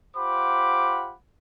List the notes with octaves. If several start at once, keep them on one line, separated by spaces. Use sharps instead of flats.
F4 G4 C5 F#5 B5 D6